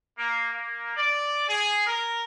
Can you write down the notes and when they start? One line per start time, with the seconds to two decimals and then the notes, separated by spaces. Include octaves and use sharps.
0.18 A#3
0.53 A#3
0.96 D5
1.48 G#4
1.86 A#4